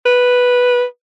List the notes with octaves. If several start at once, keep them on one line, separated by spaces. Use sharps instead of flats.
B4